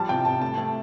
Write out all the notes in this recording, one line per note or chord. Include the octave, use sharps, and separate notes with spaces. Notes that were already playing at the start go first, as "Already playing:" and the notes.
Already playing: F3 G3 A5
C3 G5
C3 A5
A3 A5
A3